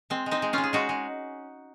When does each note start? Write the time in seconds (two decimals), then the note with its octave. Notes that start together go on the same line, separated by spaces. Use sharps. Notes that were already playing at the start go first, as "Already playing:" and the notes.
0.10 G#3 C4
0.26 G#3
0.31 C4 D#4
0.42 G#3
0.53 G#3 C#4 F4
0.64 G#4
0.73 G#3 D#4 F#4
0.89 G#3